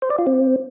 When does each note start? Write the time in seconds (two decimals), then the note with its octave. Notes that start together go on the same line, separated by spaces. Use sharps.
0.02 C5
0.10 D5
0.18 F4
0.27 C4